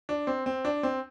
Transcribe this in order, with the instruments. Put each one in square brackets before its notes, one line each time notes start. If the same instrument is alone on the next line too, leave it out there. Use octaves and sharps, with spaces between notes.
[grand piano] D4
C4
C4
D4
C4